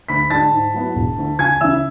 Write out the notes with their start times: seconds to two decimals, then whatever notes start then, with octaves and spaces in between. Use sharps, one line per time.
0.09 D2 B5 B6
0.30 D3 G#3 D4 A5 A6
0.52 G#2
0.74 F#3 B3 E4
0.95 E1
1.18 D2 D3
1.39 C#2 G#5 G#6
1.60 C#3 E3 E5 E6